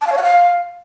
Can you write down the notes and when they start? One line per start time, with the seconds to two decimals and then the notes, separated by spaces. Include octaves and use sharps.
0.01 A5
0.07 F5
0.12 C#5
0.17 F#5
0.23 F5